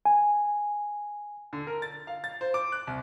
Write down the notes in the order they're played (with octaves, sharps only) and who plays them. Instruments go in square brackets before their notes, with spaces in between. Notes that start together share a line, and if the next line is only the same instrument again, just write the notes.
[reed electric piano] G#5
[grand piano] D3
A#4
A6
F5
A6
C5
D6
F#6
C2